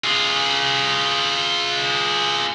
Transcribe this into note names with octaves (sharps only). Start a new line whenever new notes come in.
F4 G#4